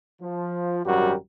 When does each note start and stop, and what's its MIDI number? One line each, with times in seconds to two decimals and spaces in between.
0.22 0.82 53
0.85 1.14 32
0.85 1.14 42
0.85 1.14 55
0.85 1.14 66
0.85 1.14 67
0.85 1.14 70